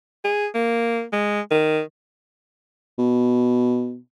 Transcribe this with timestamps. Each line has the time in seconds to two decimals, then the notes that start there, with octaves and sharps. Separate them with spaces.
0.24 G#4
0.54 A#3
1.13 G#3
1.51 D#3
2.99 B2